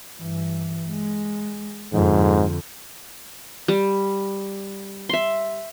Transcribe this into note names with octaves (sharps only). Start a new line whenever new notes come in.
G2 E3
G#3
F2 G#2 D3
G3
E5 C6